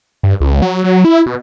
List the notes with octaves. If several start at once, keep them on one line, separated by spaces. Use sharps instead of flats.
G2
C#2
F#3
F#3
E4
B2